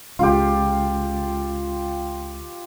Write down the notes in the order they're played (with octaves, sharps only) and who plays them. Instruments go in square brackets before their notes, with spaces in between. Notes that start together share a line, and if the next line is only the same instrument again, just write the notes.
[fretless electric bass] C#2 [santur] F4 G4